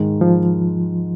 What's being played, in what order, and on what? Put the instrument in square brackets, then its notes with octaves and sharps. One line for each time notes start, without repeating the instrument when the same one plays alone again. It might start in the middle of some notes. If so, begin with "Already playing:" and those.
Already playing: [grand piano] G#2 D#3 G#3
[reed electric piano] F3